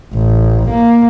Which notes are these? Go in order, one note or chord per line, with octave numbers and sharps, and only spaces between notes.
A1
A#3